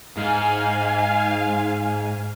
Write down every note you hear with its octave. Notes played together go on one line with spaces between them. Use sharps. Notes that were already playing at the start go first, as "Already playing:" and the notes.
G#2 F5 G#5